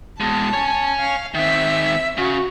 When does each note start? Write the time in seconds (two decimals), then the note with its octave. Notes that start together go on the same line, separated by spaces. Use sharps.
0.20 B2 G#3 A5
0.53 C#5 G#5
0.99 F5
1.34 D#3 C4 E5
2.17 C#3 F#4